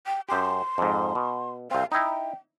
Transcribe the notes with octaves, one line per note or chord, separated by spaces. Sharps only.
G5
F#2 G4 C6
F2 G#2
B2
C2 C4 F5
D#4 E4 G5